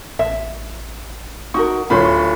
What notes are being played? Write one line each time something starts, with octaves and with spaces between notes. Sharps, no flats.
A1 E5
D#4 F#4 A#4 C#6
D1 F4 C5 C#5 B5